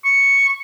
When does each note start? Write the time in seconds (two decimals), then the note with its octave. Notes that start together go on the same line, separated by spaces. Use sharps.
0.04 C#6